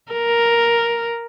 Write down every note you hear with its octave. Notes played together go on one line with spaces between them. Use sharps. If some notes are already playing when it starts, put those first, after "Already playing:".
A#4